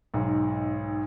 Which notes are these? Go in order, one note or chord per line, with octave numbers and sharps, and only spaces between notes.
B1 G#2